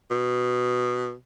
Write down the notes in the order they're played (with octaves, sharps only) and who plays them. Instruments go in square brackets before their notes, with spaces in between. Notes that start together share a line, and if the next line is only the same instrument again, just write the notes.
[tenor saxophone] B2